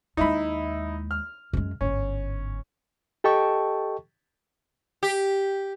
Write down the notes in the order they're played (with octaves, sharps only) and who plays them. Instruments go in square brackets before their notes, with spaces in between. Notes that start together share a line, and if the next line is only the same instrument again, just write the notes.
[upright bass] D#2 G#3 [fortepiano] D#4 E4 B5
[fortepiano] F6
[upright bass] F#2 G#3
[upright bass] G1 G#2 [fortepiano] C#4
[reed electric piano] G4 A4 D#5 G5 A5 C#6
[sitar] G4